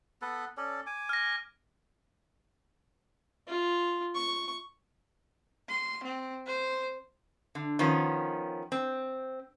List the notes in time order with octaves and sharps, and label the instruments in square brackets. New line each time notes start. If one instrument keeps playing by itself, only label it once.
[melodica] B3 A4 B4
C#4 A4 D5
G#5 D6
[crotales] F6 A#6
[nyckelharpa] F4
C#6
[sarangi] C6
C4
C5
[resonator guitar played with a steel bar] D3
D#3 F3 B3 C#4
C4